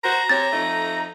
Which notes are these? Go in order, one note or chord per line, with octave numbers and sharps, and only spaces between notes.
F#4 C5 A#5
C4 G4 C#5 A6
F2 A3 D#4